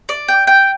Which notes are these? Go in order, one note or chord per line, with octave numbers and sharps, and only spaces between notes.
D5
G5
G5